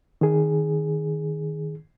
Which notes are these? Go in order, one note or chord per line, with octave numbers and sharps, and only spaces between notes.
D#3 G#4